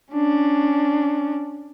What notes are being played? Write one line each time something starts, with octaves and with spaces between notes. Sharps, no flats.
C#4 D4